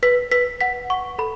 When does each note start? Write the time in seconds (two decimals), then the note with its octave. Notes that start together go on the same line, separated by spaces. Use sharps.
0.03 B4 B6
0.32 B4 B6
0.61 F#5 B6
0.90 F#5 C#6
1.18 A4 B5